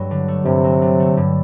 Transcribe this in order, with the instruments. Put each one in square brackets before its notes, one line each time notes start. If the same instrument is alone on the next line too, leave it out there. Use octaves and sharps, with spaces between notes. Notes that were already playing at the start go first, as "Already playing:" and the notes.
Already playing: [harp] G2 F#3 A3
D3
A3
[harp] G2 [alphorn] C3
[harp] F#3
D3
A3
G2